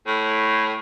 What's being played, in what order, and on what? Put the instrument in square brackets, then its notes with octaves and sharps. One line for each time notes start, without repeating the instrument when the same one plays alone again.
[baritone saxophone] A2